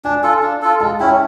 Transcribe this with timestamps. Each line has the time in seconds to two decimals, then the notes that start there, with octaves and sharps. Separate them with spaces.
0.05 D4 G#5
0.23 F4 A4
0.43 D4
0.62 F4 A4
0.81 G#3 A5
1.00 C#4 E4 G5